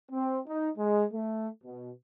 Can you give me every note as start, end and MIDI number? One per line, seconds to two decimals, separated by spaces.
0.11 0.39 60
0.48 0.68 63
0.77 1.04 56
1.13 1.48 57
1.64 1.91 47